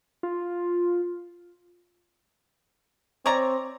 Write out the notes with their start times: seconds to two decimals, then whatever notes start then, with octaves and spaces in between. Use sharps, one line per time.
0.23 F4
3.26 C4 C#5 D5 A#5